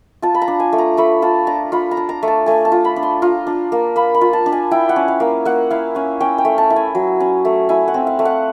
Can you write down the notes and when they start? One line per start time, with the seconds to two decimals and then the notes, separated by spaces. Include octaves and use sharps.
0.22 F4 A5
0.34 B5
0.42 A#5
0.48 D4
0.60 G#5
0.73 A3
0.78 A#5
0.97 A3 B5
1.22 F4 A5
1.47 D4 A#5
1.72 F4 B5
1.91 A#5
1.97 D4
2.09 A#5
2.23 A3
2.28 A5
2.46 A3 G#5
2.65 A5
2.72 F4
2.85 B5
2.96 D4
3.03 C6
3.22 F4 A#5
3.47 D4
3.72 A#3
3.96 A#3 B5
4.14 B5
4.21 F4
4.33 A5
4.46 D4
4.52 G#5
4.71 E4 G5
4.89 F#5
4.96 C#4
5.08 F5
5.20 A#3
5.45 A#3 F#5
5.70 E4 F5
5.95 C#4 F#5
6.20 C#4 G5
6.38 G5
6.45 A3
6.58 A5
6.70 E4
6.76 G#5
6.95 F#3
7.20 C#4
7.45 A3
7.69 E4 G#5
7.88 F#5
7.94 C4
8.07 F5
8.19 A3
8.25 F#5